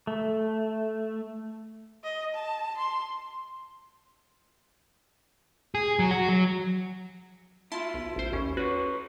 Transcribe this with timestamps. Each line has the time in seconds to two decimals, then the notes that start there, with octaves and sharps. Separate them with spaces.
0.07 A3
2.04 D#5
2.35 A5
2.78 C6
5.75 G#4
5.99 F#3
6.11 F#4
6.29 F#3
7.72 E4 F4 A5 C6
7.94 B1
8.16 A1 C5
8.32 D#2 C#4
8.57 C#4 F#4 B4 C#5